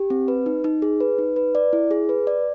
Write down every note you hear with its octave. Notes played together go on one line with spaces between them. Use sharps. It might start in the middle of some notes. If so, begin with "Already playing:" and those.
Already playing: G4
C4
B4
D#4
D#4
G#4
B4
D#4
B4
D5
E4
G#4
B4
D5